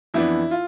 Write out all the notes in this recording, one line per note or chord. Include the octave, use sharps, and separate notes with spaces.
F2 E3 B3 D4 E4
F4